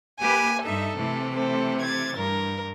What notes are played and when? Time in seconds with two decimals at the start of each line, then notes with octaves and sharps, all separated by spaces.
0.20 A#3 G4 B4 G#5
0.63 G2 D#4 A4 E5
0.97 C3 E3 A3
1.34 C4 A4
1.82 G#6 A6
2.17 G2 A#4